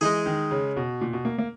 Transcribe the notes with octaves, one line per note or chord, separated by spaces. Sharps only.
E3 G#3 D#4 G#4
D#3
C#3
B2
A#2
B2
A#3
A#3